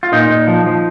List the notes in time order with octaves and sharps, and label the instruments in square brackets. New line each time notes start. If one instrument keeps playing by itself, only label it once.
[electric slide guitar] F4
A#2 D#4
A#2
F3
F3